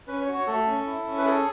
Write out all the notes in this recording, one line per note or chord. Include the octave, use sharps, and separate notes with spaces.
C#4 B4
C#5
F#4
C#5
A3 A4
C#4
E4
C#4
B4
G#4 A4